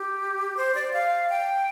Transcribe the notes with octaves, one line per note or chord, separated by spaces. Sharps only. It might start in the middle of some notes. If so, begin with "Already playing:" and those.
Already playing: G4
C5
D5
F5
G5